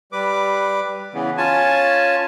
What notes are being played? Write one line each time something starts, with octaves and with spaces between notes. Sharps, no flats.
G3 B4 D6
C#3 E3 B3
C#4 F4 G#5 A5